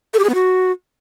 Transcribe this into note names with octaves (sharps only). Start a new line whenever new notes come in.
A4
G4
G#4
B3
F#4